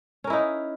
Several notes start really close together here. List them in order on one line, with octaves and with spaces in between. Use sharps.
C#4 A#4 E4 D#4